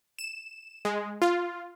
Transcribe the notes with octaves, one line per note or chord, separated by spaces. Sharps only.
E7
G#3
F4